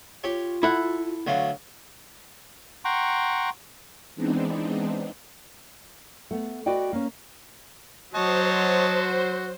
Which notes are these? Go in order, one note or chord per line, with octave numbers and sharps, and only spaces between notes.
F4 G4 C#5
E4 A4 F#5
D2 F#3 F4
F#5 G5 A#5 C6 C#6
E3 G#3 B3 C4 D4 D#4
A3 B3
F#4 B4 D5 D#5 G5
A#3 C#4
F#3 F#4 C5 C#5 D#5 A5